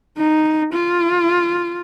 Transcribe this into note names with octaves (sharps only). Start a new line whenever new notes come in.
D#4
F4